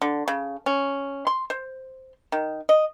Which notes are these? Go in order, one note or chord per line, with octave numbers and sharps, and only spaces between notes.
D3
C#3
C#4
C6
C5
D#3
D#5